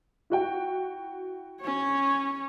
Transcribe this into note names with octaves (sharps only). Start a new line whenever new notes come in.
E4 F#4 G5
C#4 C#5